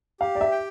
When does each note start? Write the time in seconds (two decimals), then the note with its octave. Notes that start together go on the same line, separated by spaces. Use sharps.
0.20 G4 F5
0.35 D5
0.41 E5
0.52 G5